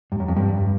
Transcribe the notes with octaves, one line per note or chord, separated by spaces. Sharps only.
G2
F#2
F2
G2